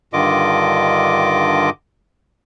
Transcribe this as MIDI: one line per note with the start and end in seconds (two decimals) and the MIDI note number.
0.13 1.70 43
0.13 1.70 50
0.13 1.70 51
0.13 1.70 65
0.13 1.70 75
0.13 1.70 86